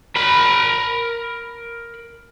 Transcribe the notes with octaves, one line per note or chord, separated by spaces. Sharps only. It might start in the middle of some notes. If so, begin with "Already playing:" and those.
A#4 B5